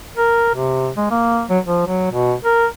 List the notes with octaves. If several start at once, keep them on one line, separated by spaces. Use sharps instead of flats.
A#4
C3
G#3
A#3
F#3
F3
F#3
B2
A#4